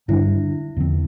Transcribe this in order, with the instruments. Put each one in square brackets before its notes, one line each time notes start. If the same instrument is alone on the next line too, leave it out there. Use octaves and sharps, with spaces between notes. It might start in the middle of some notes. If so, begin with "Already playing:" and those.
[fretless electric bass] G2 D3 G3 D4 [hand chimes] E4
[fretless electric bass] E2 D3 F3 C4